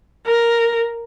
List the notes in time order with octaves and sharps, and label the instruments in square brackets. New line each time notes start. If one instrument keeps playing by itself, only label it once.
[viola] A#4